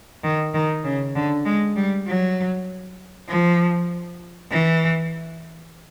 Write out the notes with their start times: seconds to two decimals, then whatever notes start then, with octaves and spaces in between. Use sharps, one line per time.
0.24 D#3
0.54 D#3
0.84 C#3
1.15 D3
1.45 G#3
1.77 G3
2.07 F#3
3.29 F3
4.51 E3